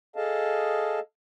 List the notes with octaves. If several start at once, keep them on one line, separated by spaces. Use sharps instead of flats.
G#4 A4 D#5 F5 A5